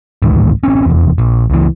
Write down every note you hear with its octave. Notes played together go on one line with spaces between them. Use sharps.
A1 D2 G#2 D#3
A1 C4 C#4
F1 E2
A#1
C#2 E3